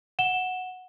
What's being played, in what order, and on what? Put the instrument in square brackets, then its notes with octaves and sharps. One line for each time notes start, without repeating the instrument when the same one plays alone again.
[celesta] F#5 E7 G7